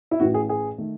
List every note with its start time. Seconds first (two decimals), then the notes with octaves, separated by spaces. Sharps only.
0.11 E4
0.20 A1 A2 E3 F#4
0.34 G#4
0.49 G#4
0.78 D#3 A3